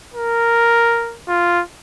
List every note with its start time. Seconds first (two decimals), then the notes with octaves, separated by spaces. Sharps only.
0.14 A#4
1.28 F4